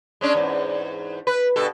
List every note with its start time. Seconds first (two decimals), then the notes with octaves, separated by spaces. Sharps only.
0.21 G#3 C#4 D4
0.34 E2 G#2
1.27 B4
1.56 G2 B2 A4